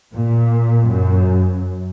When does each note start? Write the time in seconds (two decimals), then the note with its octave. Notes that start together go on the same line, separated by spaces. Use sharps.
0.15 A#2
0.89 F#2